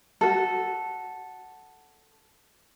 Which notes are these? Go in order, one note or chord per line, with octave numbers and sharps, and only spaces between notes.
F#4 A4